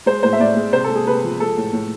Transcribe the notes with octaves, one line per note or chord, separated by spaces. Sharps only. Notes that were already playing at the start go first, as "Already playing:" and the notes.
G#3 C5
A2 C5
E5
A2 D5
G#3
C3 C5
A4
G#3
G#4
C3 B4
F3
G#3 A4
A2
A2